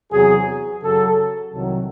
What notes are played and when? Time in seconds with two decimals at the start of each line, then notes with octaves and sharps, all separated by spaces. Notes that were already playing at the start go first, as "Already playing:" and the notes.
0.11 E2 C3 F#3 G#4
0.82 F#2 C#3 F#3 A4
1.53 C2 C3 D#3 F#3